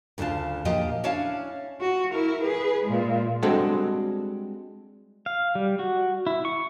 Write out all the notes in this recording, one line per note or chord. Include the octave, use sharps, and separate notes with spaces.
D2 C#3 D4 F4 A5
E2 A#2 F3 G4 D#5 G5
C#4 D4 E4 C#5 F5 A5
F#4
E4 A#4
G#4 B4
A#2 G#3
G3 G#3 C4 D4 F#4 A4
F5
G3
F#4
E4
C#6